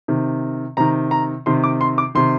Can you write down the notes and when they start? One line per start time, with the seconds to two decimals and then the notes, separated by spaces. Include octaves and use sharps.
0.08 C3 D#3
0.77 C3 D#3 A#5
1.11 A#5
1.46 C3 D#3 C6
1.64 D6
1.81 C6
1.98 D6
2.15 C3 D#3 C6